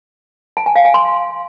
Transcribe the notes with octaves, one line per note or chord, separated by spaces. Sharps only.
A5
G#5
F5
G#5
C6